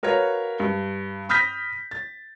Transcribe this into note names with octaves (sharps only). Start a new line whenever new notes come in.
F#4 A#4 B4 C#5 F5
G2
B5 D#6 F6 G6 A#6 B6
A6